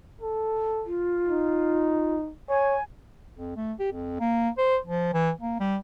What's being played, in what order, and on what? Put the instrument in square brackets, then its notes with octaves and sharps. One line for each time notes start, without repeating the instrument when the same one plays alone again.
[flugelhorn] A4
[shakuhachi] F4
[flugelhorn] D#4
[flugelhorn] C#5 [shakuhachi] G#5
[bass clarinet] F2
A3
G4
F2
A#3
C5
F3
E3
A#3
G3